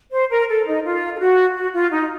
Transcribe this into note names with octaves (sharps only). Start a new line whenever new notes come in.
C5
A#4
A4
D#4
F4
A4
F#4
F#4
F4
D#4